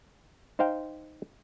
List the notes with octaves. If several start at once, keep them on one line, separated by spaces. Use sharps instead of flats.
D#4 C5 F5 G5